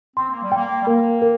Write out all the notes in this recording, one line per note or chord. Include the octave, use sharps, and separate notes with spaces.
C4 C6
A#3
G3
A#3 G5
G3
A#3 A#4
A#4